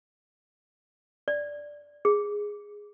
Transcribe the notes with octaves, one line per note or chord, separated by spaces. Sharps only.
D5
G#4